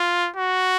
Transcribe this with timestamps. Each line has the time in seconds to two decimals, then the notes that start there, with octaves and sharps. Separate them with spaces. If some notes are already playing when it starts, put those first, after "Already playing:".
Already playing: F4
0.36 F#4